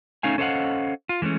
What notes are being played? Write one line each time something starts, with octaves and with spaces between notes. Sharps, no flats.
A3 C#4 D#4 F5 G#5
C#4 A4 C5 D#5 F5 F#5
F4
E3 G#3 A3 C#4